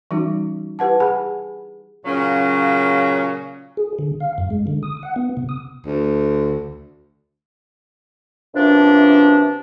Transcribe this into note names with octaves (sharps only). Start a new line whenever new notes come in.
E3 G3 C#4 D#4 F#4
E4 G4 B4 F#5 A5
G#4 F#5 G#5 B5
A#2 C#3 F#3 C#4
G#4
D3
F5
F#2
G#3
D3
D#6
F#5
B3
C3
D#6
D2
F#2 C3 E3 F3 D4